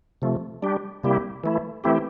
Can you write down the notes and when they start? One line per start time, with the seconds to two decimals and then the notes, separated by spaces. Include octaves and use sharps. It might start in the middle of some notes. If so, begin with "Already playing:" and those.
0.22 C3 F3 A3
0.62 G3 D4 G4
1.03 C3 G3 A#3 E4 G4
1.44 E3 A3 E4
1.84 E3 A3 C4 E4 G4